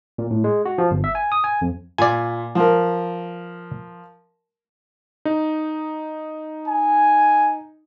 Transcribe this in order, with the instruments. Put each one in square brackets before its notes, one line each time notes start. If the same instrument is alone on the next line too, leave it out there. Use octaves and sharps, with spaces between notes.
[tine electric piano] A#2
A2
G#3
F#4
F3
G1
E5
G#5
D#6
G#5
F2
[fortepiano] A#2 [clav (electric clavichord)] D5 G#5
[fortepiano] F3 A#4
[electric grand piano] D#4
[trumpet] G#5